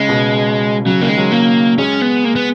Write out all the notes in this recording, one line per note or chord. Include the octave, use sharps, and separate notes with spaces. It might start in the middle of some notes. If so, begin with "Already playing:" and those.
Already playing: C#3 G#3
B2
C#3 F#3
D#3 A#3
G#3
F#3
A#3
G#3 C#4
B3
A#3
B3